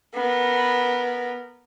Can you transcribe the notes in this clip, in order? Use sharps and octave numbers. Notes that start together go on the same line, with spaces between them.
B3 A#4